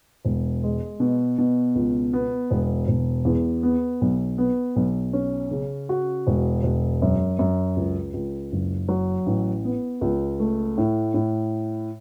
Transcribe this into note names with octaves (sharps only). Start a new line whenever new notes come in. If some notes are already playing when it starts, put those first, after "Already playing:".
E1
G#3
B2
B2
C#2
B3
E1
E1
E2
B3
B1
B3
B1
C#4
C#3
F#4
E1
E1
F#2
F#2
C#2
C#2
F#1
F#3
A1
B3
C#2
A3
A2
A2